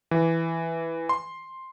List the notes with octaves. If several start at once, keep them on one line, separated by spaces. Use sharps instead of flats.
E3
C6